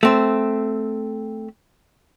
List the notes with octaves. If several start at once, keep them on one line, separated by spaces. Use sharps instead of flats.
A3 C4